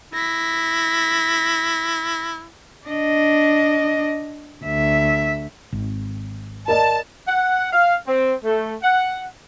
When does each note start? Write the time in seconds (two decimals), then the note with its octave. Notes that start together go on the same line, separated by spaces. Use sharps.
0.14 E4 A#6 B6
2.87 D4 D#5
4.64 D2 E5
5.72 G#1
6.68 A#4 D5 D#5 A5
7.28 F#5
7.72 F5
8.07 C4
8.44 A3
8.83 F#5